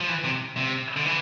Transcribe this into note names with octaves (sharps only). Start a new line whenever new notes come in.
F3
E3
C3
C3
D3
E3